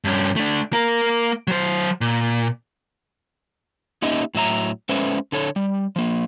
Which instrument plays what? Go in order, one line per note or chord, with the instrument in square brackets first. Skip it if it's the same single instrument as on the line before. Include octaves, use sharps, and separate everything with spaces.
[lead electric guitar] G2 C#4
A3 D4
A#3 A#4
F#3 C5
A#2
[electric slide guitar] A#3 C#4 D#4 G4 D#5 E5
A2 F#3 E5 A#5
G#3 C#4 A4 B4 C5 E5
D3 A4 C#5
G3
F3 A#3